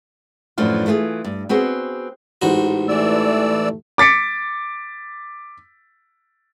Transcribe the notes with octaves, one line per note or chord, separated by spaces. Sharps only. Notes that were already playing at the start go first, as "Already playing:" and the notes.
F#2 A2 E3 F3 D4 F4
E3 A3 F4 F#4 G#4
G2
B3 C4 F#4 G#4
A1 G#2 F#4
E3 A3 D5 E6
D6 A6 B6 C#7 D7